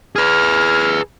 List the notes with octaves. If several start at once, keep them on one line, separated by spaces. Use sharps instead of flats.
G#4 B4 F6